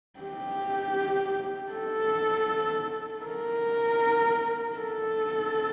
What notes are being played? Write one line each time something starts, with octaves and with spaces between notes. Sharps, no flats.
G4
A4
A#4
A4